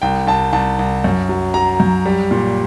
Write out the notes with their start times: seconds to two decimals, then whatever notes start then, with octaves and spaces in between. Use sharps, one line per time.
0.02 C2 G5
0.27 C2 A5
0.53 C2 A5
0.79 C2
1.04 F#2
1.29 F#3
1.54 F#3 A#5
1.80 F#2
2.06 G3
2.31 A#2